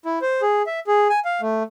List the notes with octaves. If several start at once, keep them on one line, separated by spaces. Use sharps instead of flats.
E4
C5
G#4
E5
G#4
G#5
F5
A3